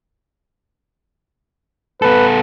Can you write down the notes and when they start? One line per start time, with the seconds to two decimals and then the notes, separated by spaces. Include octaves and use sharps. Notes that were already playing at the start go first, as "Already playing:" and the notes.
2.02 B3 A4 B4